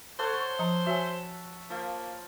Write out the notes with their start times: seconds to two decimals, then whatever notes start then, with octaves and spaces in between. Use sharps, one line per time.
0.19 A4 C5 C#5 F#5
0.33 C#6
0.59 F3 A#5
0.86 F#4 C#5 E5 G#5
1.70 F3 A#3